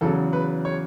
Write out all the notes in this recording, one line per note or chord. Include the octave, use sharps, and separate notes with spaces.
E2 C#3 F#3 A4
B4
C#5